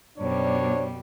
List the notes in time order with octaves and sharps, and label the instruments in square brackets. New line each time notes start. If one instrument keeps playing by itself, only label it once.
[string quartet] F#2 B2 G3 [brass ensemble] D4 C5 C#5